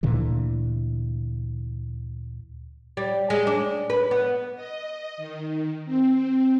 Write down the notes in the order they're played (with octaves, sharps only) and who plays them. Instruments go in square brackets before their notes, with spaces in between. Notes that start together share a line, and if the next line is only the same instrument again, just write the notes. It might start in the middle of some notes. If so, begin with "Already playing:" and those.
[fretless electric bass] D2 A#2 D3 E3
[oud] G3
G#3
D4
B4
B3
[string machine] D#5
D#3
C4